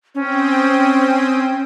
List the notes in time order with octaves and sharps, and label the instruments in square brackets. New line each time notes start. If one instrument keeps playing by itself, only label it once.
[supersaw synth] C4 G5 D#6 [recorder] C#4